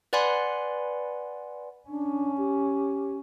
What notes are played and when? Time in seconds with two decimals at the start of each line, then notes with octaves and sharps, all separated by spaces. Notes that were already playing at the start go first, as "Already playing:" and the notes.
0.13 B4 D5 F#5 G#5 B5 C6
1.89 C#4 D4
2.38 G4